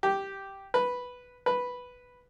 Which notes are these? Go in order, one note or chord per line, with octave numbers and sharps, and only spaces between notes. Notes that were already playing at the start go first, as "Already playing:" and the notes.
G4
B4
B4